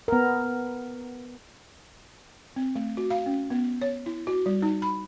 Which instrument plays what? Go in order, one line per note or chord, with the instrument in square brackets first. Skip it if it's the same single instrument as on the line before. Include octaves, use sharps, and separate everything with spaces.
[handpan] B3 A#4
[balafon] C4
A3
F#4
F5
C#4
B3
C#5
E4
F#4
G3
D#4
B5